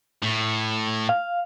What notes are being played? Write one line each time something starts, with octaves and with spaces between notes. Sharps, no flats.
A2
F5